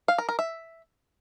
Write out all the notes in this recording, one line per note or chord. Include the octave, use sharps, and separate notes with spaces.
F5
A#4
A#4
E5